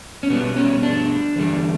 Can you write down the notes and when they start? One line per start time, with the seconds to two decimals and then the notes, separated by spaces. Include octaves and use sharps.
0.23 C#4
0.30 B2 G3 B3
0.57 C#4
0.83 D4
1.36 E2 D3 G3